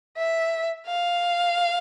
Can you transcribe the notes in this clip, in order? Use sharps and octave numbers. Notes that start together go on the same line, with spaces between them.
E5
F5